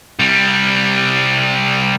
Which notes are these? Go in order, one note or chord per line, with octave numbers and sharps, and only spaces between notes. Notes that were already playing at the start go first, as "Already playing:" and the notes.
C2 G3